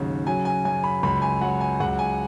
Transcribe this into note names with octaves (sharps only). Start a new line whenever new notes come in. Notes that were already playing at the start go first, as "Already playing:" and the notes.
Already playing: D#2 G#2 C#3 F#3
F#3 G#5
G#5
F#2 G#5
B5
C#2 B5
G#5
F#3 F#5
G#5
C#2 F#5
G#5